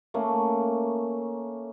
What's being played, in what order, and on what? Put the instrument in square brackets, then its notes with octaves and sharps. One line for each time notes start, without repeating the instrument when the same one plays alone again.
[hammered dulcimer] A3 A#3 C#4